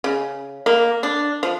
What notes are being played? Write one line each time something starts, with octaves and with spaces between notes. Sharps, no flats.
C#3
A#3
D4
F3